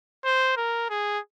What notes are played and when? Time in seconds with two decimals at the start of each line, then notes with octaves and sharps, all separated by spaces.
0.25 C5
0.57 A#4
0.90 G#4